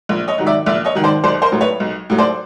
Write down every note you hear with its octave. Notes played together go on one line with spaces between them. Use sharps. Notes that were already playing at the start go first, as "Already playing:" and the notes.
A#1
C#5 D#5
G#2 D#3 F#3
D5 E5
A#1 D5 E5
C#5 D#5
G#2 D#3 F#3
C5 D5
B1 C5 D5
A#4 C5
A2 F#3
B4 C#5
B1
A2 F#3
C5 D5